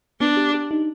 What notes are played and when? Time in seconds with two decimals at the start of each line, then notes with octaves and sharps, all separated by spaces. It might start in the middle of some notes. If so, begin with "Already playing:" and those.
0.20 B3 D4
0.37 G4
0.54 G4
0.71 D#4